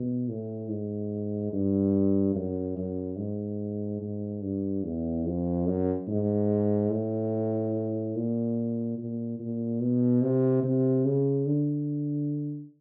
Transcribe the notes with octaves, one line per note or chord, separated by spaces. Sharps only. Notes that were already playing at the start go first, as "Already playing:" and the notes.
Already playing: B2
A2
G#2
G2
F#2
F#2
G#2
G#2
G2
E2
F2
F#2
G#2
A2
A#2
A#2
A#2
B2
C3
C3
C#3
D3